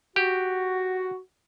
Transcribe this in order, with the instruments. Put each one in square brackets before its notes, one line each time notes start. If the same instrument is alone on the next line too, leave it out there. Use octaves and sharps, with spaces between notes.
[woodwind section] F#4 [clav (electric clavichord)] G4